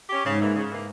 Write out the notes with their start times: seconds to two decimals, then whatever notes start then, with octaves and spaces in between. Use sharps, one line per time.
0.09 C#4 G4
0.24 G#2 C#3
0.39 E3 A#3
0.55 C#3
0.70 E3 A#3